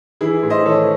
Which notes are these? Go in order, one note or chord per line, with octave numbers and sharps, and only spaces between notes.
E3 E4 G#4
A2
C5 D#5
E3 A4 C#5